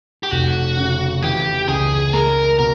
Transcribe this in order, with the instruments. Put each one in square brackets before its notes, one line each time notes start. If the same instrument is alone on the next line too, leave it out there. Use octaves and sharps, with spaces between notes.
[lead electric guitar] G4
[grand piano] F1 [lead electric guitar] F#4
[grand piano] C#3
[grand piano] E3 [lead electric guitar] G4
[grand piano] C#2 [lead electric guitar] G#4
[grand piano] G#3 [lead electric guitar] A#4
[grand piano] B2 [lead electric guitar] A#4